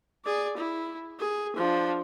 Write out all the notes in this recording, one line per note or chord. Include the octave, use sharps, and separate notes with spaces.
G#4 D5
E4
G#4
F3 D4